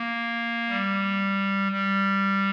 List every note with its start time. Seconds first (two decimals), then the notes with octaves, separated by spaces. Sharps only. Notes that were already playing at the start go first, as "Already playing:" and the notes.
Already playing: A#3
0.69 G3
1.72 G3